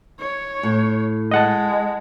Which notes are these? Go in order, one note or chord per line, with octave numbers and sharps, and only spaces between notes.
C#5
A2
G#3 D#5 F#5 A5